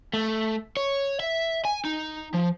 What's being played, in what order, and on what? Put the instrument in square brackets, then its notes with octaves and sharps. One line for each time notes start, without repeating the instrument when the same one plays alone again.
[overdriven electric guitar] A3
C#5
E5
G#5
D#4
F3